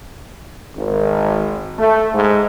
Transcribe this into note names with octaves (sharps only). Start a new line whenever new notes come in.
G#1
A3
G#2